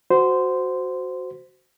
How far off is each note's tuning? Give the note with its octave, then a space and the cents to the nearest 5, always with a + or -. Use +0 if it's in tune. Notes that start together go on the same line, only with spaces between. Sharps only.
F#4 +0 C5 -15